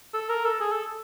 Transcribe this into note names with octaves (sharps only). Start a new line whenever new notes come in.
A4
A#4
A4
G#4
A4